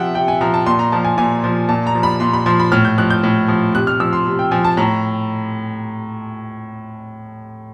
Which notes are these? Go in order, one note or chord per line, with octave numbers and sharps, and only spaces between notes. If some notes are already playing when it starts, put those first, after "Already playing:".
Already playing: C3 F3 E5 F#5 G5
C3 G5
G#5
F3 A#5
A5
A#2 C6
A#5
F3 A5
G#5
A#2 G#5
F3
A#2 A5
A#5
F3
B5
A#2 C6
B5
F3 C6
B5
A2 F6
G6
F3 F#6
G6
A2
F3
C3 F#6
F6
F3 E6
C6
C3
G5
F3 G#5
A5
A2 A#5